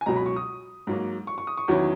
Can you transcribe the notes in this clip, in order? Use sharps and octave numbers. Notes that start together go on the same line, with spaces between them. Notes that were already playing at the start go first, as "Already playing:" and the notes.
G#5
C#2 B2 F#3 A#5
B5
C#6
D#6
G#2 F#3 A#3
C#6
C#6
D#6
C#6
E2 D#3 F#3 C#4 E4